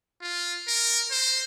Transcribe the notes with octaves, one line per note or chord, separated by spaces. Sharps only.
F4
A#4
C5